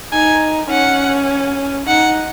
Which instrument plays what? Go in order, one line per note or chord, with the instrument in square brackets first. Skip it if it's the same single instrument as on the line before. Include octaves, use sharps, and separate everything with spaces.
[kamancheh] D#4 [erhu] G#5
[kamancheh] C#4 [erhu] F#5
[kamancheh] D#4 [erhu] F#5